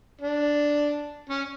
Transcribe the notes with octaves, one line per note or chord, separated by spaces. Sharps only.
D4
C#4